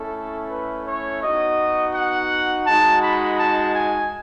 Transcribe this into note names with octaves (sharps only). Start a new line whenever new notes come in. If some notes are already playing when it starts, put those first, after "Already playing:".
Already playing: A3 C#4 E4 A4
B4
C#5
B3 D#4 F#4 D#5
F#5
G#3 D#4 F#4 A5
B5
A5
G#5